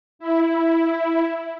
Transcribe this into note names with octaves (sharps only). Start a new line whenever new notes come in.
E4